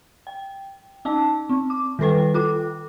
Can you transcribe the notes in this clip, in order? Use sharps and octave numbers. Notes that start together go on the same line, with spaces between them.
G5
C#4 D#4 A5
C4
D6
D#3 G3 A4 B4 G5
F4 A4 D6